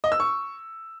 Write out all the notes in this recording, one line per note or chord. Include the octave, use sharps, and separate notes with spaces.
D#5
E6
C#6